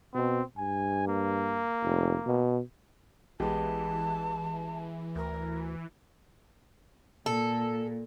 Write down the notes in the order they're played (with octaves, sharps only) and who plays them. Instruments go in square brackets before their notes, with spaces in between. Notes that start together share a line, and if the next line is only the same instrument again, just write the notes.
[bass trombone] B2 [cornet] C4
[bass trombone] G2 [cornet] G#5
[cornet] A#3
[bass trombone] F1
B2
[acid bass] A1 [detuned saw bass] E3 [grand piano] G#3 B3 G4 [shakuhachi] A5
[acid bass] D2 [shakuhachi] A#4
[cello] A#2 [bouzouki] A4